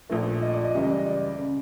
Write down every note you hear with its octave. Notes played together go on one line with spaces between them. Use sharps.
A#1 A#2 F3 A3
D#5
D5
D#5
C#2 C#3 E3 G3 E5
D#5
D5
D#5
D5
C#3